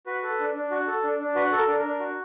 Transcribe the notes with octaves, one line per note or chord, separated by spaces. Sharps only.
F#4 B4
A4
D4
D4
F#4
A4
D4
D4
F#4 B4
A4
A#4
D4
A#4
D4
F#4